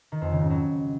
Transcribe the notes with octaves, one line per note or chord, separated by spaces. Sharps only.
D#3
F2
C#3
G#2
F#3